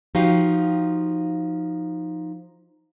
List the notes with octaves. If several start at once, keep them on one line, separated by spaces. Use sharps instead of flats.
F3 D#4 F#4 G4 F5